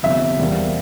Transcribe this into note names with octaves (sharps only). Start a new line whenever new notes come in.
G1 F2 C3 E5
E2 C3 G3 A#3